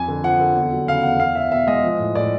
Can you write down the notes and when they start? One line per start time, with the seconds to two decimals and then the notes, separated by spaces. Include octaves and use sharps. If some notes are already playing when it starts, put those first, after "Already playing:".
Already playing: F2 G#5
0.08 D3
0.23 F3 F#5
0.39 D3
0.56 E2
0.72 F#3
0.88 C#3 F5
1.03 E2 F#5
1.19 E2 F5
1.35 E2 E5
1.52 B2 E5
1.67 G#3 D#5
1.84 F3
1.99 A2
2.15 A2 D5